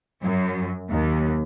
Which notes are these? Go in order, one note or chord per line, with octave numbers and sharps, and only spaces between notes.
F#2
D#2